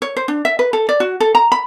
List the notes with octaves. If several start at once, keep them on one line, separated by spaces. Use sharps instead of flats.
C#5
C5
D4
E5
B4
A4
D5
F#4
A4
A#5
B5